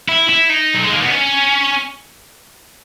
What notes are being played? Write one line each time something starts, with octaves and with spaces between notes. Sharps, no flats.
E4
E4
D#4
F#3
G#3
A#3
B3
C#4